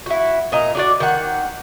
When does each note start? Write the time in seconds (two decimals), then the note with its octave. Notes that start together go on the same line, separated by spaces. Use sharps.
0.06 E4 F#4
0.52 A#2 D#5 A#5
0.75 D4 F#4 D5
1.00 D#3 F#5